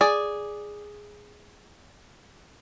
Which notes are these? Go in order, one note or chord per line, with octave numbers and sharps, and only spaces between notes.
G#4 D5